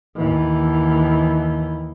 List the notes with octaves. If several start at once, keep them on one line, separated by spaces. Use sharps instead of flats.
D#2 E3